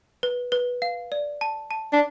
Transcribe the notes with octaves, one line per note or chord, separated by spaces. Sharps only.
B4
B4
F5
D5
A5
A5
D4